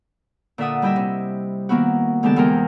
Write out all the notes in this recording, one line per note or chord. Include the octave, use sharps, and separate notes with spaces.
A#2 D3 D5 E5 F#5 D#6
G3 E4 G4 D#5 E5
C3
D#3 A#3 B3 E4 F#4
D3 E3 G#3 B3 G4 A5
E2 C3 G#3 A#4 G5